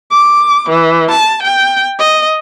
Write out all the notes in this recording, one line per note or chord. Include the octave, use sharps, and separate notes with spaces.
D6
E3
A5
G5
D#5